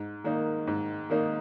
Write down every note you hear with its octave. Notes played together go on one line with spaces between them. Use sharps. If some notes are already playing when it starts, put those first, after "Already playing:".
Already playing: G#2
D#3 A#3 D#4
G#2
D#3 A#3 D#4